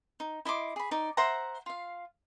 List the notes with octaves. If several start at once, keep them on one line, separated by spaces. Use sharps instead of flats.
D#4
E4 D#5 C6 D6
G#4 B5
D#4 D5
C5 E5 F#5 A#5
F4 F5